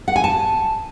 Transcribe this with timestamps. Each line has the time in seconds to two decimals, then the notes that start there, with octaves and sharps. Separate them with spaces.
0.08 F#5
0.16 G#5
0.24 A5